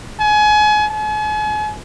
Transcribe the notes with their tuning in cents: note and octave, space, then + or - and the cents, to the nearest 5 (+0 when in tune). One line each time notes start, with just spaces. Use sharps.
G#5 +30
G#5 +40